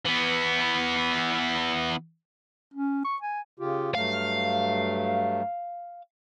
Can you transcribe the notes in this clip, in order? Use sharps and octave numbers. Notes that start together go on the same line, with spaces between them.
E3 B3
C#4
C#6
G#5
C#3 F4 G4
G2 F#3 A3 F5